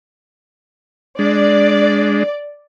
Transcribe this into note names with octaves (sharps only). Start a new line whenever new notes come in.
G#3 D4 D5